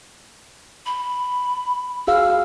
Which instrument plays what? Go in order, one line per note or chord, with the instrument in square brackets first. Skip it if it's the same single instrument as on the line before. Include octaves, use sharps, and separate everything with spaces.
[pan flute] B5
[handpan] F#4 G#4 F5 [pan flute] E6